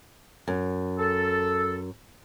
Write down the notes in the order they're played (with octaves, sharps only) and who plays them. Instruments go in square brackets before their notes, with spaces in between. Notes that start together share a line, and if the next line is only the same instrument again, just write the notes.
[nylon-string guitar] F#2
[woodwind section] A4